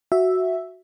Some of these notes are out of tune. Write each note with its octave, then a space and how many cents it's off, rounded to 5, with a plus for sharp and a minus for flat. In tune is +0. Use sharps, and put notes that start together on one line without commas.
F#4 +0 E5 +0